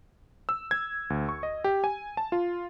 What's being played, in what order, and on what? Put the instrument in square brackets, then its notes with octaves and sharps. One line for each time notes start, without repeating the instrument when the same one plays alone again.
[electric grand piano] E6
G#6
D2
C#6
D#5
G4
G#5
A5
F4